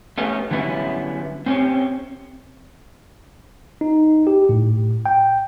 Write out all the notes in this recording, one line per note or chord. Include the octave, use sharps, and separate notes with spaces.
A3 B3 C#4 G4
D3 F#3 G3 B3 C#4 E4
C4 C#4 G4 C5 C#5
D#4
G4
A2
G5